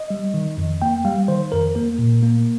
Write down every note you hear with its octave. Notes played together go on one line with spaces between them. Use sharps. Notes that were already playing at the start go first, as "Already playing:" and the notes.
Already playing: D#5
G3
D#3
F2
A#3 G5
G3 F5
D#3 C5
F2 A#4
A#3 A#4
A#2
A#3